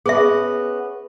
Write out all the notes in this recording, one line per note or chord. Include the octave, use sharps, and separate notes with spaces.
B3 C#4 G#4 E5